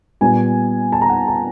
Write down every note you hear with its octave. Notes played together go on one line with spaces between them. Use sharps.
A#2 G3 B3 G#5
A5
A#5
F#5
A5